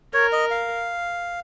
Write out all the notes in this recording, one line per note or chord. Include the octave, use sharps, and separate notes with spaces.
A#4 C#5
D#5
F5